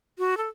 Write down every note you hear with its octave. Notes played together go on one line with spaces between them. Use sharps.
F#4
A4